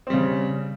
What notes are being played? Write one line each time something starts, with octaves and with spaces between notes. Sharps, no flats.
C#3 G3 C4